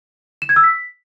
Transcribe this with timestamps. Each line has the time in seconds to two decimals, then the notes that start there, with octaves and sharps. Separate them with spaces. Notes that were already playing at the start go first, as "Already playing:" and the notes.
0.42 E7
0.49 G#6
0.56 E6
0.64 B6